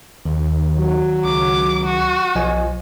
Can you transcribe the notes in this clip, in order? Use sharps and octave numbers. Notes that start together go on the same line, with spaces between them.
D#2 D#3
F#3
C#2 D6
F#4
B1 F3 D#5 G#5